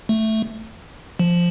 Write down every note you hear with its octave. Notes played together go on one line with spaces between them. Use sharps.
A3
F3